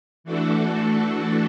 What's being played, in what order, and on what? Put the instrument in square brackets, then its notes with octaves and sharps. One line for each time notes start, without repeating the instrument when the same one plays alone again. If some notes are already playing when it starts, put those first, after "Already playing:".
[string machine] E3 A3 D4 F#4 A4